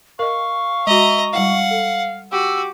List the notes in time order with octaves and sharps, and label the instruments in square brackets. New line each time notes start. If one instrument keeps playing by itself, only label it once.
[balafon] A#4 D#5 [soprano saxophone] F5 [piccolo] C#6
[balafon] G#3 F#4 [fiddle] D#5 A#5 [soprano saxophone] E5
[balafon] G3 E4 [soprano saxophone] F5 [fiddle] F#5
[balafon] A4
[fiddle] F#4 [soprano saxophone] G4 [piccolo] E6